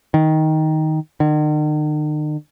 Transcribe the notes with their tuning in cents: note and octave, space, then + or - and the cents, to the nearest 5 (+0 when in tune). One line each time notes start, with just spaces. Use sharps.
D#3 +10
D#3 -45